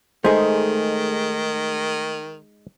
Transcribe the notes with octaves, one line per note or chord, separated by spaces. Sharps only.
D#3 G#3 A3 D#4 G#4 C5